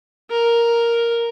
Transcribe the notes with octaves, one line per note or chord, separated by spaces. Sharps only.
A#4